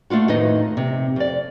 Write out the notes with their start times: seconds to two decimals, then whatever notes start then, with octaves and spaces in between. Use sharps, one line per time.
0.10 A3 D4 F4 F#4
0.28 F2 A2 D#3 D#4 B4 D#5
0.77 C3
1.16 F2 D5